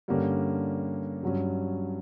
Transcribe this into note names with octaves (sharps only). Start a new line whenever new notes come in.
G2 D3 A#3 C#4 G4
G2 F#3 C#4